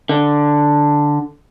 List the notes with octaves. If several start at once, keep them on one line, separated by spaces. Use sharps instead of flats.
D3